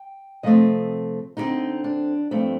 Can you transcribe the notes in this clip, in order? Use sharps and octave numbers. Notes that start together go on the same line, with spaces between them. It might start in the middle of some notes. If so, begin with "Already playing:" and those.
Already playing: G5
C3 F3 A3 C4 D#5
D3 G3 C4 D#4
D4
G2 F3 A3 C4